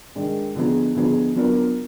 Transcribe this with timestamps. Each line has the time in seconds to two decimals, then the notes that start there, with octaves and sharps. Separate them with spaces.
0.15 D#3 G#3 D4
0.55 D3 F3 B3 D#4 G#4
0.95 D3 F3 B3 D#4 G#4
1.35 F#3 B3 D4 F4 A#4